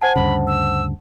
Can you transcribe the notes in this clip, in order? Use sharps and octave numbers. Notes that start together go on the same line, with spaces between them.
C5 F#5 G#5 A5
D2 G2 C#3 B5
E6